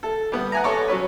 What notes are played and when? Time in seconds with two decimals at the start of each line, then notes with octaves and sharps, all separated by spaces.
0.03 A4
0.32 G3 B3
0.52 F#5 G#5 A#5
0.64 A4 C#5 D6
0.88 F#3 C#4 B4